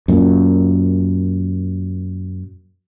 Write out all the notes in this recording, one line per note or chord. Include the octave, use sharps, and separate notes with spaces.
F#2 A#2